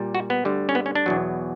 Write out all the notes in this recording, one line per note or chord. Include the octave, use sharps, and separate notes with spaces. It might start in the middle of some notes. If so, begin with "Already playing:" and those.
Already playing: A#2 G3
F#4
B3
D2 D3 G3
C#4
B3
C#4
D4
E2 B2 F#3